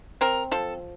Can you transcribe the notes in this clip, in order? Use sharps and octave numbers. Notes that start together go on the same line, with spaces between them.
C4 A#4
F3 A4